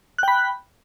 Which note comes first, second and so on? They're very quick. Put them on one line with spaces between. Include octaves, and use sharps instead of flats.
F#6 G5 B5